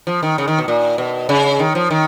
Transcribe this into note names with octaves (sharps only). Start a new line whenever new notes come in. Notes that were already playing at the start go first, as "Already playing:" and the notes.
F3
D#3
C#3
D#3
B2
A#2
B2
C#3
D#3
F3
D#3